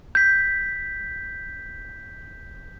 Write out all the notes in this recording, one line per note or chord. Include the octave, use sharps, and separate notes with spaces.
G6 B6